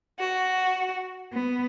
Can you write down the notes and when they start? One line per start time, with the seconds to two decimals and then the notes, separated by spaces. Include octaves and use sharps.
0.19 F#4
1.33 B3